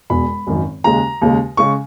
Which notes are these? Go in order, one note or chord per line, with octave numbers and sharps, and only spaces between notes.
E1 E2 B2 B5
G#1 F#2 D#3
D#2 C#3 G#3 A#5
D#2 C#3 G#3
C#3 G#3 C#6